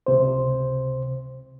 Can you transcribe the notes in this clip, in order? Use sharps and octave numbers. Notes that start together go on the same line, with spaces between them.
C#2 C3 C5